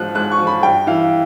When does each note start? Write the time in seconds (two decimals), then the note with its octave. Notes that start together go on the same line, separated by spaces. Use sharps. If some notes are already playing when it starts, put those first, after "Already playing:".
Already playing: G#2 F3 F#6
0.15 G#2 F#6
0.31 C#6
0.39 F3
0.47 B5
0.63 G2 G5
0.87 E3 F5